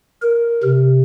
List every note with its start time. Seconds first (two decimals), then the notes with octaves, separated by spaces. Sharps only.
0.22 A#4
0.64 C3